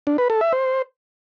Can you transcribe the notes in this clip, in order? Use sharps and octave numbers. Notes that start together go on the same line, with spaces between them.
D4
B4
A4
E5
C5